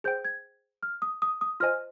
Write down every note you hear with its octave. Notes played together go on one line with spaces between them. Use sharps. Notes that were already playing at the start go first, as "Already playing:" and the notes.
G#4 C5 G5 G6
G#6
F6
D#6
D#6
D#6
F4 C5 D#5 G#5 F6